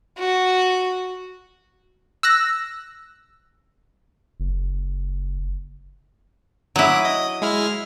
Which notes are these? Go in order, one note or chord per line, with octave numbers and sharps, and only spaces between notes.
F#4
E6 F#6 A#6
F#1
F#3 E4 D6 D#6 F#6
D#5 D#6
G#3 E4 F6